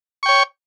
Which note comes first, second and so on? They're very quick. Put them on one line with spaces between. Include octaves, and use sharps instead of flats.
C#6 G5 C#5